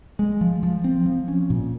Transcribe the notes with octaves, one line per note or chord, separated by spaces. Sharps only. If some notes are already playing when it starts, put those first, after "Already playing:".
G#3
F3
F3
C4
F3
C#4
A#2